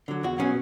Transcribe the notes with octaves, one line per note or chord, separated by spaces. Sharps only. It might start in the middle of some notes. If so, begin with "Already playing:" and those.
D3 F#3
E2 F#4
B2 F#3 C#4